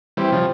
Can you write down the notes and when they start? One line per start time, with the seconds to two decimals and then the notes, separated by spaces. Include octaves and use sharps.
0.17 E3 G3 C4
0.32 C#3 F3